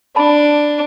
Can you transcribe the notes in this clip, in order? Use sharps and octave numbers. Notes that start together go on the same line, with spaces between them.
D4 A5 B5